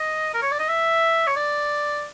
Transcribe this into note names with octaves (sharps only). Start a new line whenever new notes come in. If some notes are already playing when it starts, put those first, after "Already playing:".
Already playing: D#5
A#4
C#5
D5
D#5
E5
C#5
D5